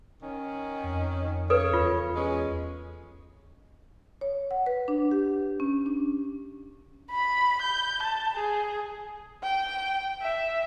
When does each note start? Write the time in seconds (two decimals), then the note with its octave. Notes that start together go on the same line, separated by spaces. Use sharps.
0.22 D#3 C#4
0.84 F2
1.50 C#3 A4 B4 C#5
1.74 E2 F4
2.15 G#3 C#4
4.21 C#5
4.51 F#5
4.66 B4
4.88 D4
5.11 G4
5.60 C#4
5.86 D4
7.10 B5
7.62 G6
8.03 A5
8.35 G#4
9.43 G5
10.21 E5